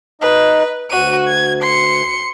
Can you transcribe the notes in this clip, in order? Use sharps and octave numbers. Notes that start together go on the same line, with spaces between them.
D#4 B4 D#5
D2 F#4 D#7
G#6
C6 C#7